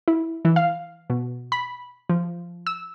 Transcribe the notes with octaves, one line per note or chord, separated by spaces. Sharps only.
E4
E3
F5
B2
B5
F3
E6